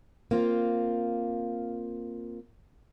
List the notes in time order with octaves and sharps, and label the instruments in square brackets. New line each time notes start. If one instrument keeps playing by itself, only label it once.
[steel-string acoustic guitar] A#3 C4 F4